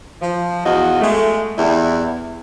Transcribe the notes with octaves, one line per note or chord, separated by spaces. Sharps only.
F3
E2 F4 F#4 D#5
G#3 A3
E2 G3 E4